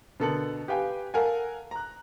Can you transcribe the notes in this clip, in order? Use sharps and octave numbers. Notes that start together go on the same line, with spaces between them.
B2 D3 A4 A#4 C#7 F#7
G4 B4 F5 G5 G#5
A4 A#4 F5 F#5 G#5
A#5 F#6